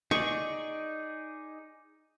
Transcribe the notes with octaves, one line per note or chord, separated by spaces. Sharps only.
D#4 G#4 D5 C#6